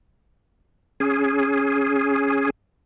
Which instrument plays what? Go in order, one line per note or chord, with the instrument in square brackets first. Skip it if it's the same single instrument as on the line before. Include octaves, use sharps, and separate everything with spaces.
[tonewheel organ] C#4 G#4